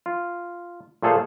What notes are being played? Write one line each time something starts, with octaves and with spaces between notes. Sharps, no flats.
F4
A#2 A3 G#4 A4 C5 F5